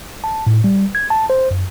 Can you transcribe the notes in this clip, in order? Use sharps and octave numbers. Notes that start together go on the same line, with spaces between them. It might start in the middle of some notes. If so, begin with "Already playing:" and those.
A5
A2
G3
G#6
A5
C5
F#2